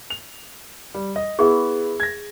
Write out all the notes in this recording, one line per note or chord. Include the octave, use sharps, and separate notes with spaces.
F7
G3
D#5
B3 E4 G4 G#4 C#6
G#6 A#6